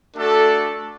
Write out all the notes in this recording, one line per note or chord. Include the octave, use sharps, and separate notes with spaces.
A3 D4 F#4 A4 D5